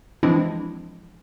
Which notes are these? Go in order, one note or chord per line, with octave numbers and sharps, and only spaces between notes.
E3 F3 G#3 C4 D4 E4